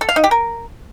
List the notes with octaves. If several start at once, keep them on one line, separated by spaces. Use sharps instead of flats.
A4
F5
D#4
G4
A#4